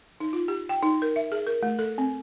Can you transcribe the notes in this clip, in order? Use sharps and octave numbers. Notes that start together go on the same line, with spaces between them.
D#4
F4
G4
G5
D#4
A#4
E5
G#4
A#4
A3
A4
C4